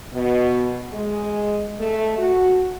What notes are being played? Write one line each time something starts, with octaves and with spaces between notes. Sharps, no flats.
B2
G#3
A3
F#4